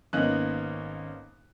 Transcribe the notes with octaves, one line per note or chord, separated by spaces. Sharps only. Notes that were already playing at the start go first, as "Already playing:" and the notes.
G#1 A#3 B3 C#4 D#4 F#6